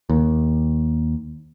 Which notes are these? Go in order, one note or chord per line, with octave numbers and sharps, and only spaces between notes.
D#2